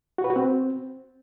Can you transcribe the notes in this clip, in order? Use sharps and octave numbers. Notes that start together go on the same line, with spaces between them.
F#4
B4
F#4
C4